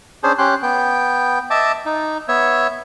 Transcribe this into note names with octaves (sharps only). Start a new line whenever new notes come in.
C#4 D4 G#4 C5
C#4 G4 C6 F#6
B3 G5
D#5 E5 A5 D6
D#4
B3 C#5 E5